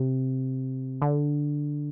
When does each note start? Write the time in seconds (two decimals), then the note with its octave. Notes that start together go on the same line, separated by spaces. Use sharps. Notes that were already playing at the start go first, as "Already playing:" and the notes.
Already playing: C3
1.02 D3